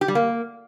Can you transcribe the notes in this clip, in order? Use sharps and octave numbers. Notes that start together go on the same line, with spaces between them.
G4
G3
A#3